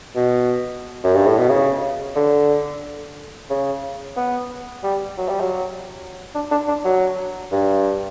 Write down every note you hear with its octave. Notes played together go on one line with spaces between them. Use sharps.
B2
F#2
G2
A2
B2
C#3
D3
C#3
B3
G3
F#3
G3
F#3
D4
D4
D4
F#3
G2